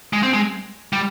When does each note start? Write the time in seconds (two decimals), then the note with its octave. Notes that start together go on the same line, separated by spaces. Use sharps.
0.13 G#3
0.23 C4
0.33 G#3
0.93 G3